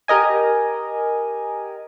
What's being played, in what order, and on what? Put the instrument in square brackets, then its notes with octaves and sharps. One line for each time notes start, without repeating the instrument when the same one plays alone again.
[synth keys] G4 A#4 D#5 G#5